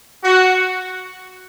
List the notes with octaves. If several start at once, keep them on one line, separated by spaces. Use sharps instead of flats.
F#4